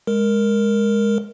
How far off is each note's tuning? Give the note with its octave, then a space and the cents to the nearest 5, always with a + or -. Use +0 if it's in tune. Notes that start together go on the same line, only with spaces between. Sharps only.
G#3 +0 A#4 +0